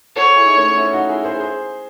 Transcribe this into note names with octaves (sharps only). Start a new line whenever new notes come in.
F#4 A4 C#5
E4 G#4
D#4
A3 C#4
C#4 E4
D#4 F#4
E4 G#4
G#4 C5
G#4 C5